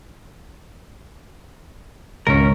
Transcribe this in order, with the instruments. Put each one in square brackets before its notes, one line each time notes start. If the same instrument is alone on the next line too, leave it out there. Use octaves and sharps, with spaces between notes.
[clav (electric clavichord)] G#1 C#2 [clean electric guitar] C#4 A#4